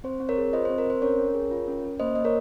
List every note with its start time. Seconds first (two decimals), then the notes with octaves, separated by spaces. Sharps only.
0.04 C4 C5
0.20 C4
0.29 A#4 C#5
0.38 G#4
0.53 F4 C5 D#5
0.65 C4 C5
0.78 A#4
0.86 C4 C5
1.02 C#4 A#4 C#5
1.19 C#4
1.34 G#4
1.51 F4
1.67 C#4
1.84 C#4
2.00 A#3 C5 D#5
2.15 A#3 D#5
2.25 A#4 C#5